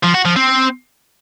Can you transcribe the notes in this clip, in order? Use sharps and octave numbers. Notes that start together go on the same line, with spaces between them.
F3
F#4
F3
C4